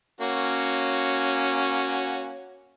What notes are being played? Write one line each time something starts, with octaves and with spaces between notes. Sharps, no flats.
A#3 C#4 F#4